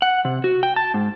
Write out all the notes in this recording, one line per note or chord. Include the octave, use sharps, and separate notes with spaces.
F#5
C3
F#4
G5
A5
G#2